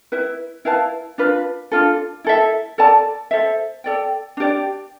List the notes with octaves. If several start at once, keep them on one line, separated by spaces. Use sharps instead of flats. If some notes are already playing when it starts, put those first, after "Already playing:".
E4 B4 E5
E4 B4 F5 A5
D4 F4 B4
D4 F4 A4
E4 A4 E5
A4 D5 A5
A4 C5 E5
A4 D5 G5
D4 G4 D5